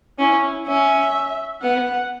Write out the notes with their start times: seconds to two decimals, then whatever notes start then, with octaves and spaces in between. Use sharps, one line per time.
0.19 C#4 E4
0.67 C#4 E5
1.62 B3 F#5